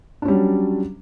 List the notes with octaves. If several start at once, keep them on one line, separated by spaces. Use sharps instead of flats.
F#3 G3 C#4 D4